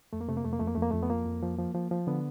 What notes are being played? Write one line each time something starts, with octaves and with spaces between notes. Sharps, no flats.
F2 A3
A#3
C3 A3
A#3
F2 A3
A#3
F2 A3
A#3
A3
F2 A#3
F2 A3
B3
F3 A#3
F2
F3
F3
F3
F3
D3 B3